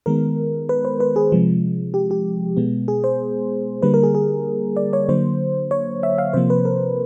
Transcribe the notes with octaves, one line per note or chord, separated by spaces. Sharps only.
D#3 G#3 B3 A#4
B4
C5
B4
G#4
C3 F3 G#3
G4
G4
B2 G#3 B3
G#4
C5
D3 G3 A#3 B4
A#4
G#4
G#4
D5
C#5
D3 F#3 A#3 C5
C#5
E5
F5
C3 F3 A#3 C5
B4
A#4